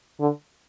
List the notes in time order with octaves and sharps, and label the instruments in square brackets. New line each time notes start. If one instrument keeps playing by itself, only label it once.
[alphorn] D3